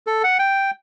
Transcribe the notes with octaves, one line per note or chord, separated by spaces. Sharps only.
A4
F#5
G5